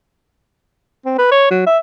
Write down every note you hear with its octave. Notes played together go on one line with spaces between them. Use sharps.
C4
B4
C#5
F#3
E5